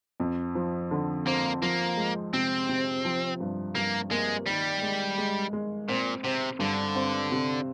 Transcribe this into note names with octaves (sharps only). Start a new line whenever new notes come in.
F2
F3
D3
A#3 C4
F3 A#3
G#3
C3 C4
C3
F3
G2
G2 A#3
G#3 A#3
D#3 G3
G#3
G#3
G#3
A#2 C4
C3 C4
G2 D3
C4
C3